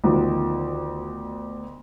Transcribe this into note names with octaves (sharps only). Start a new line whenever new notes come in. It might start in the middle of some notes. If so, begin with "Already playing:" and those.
D2 B2 D#3 F3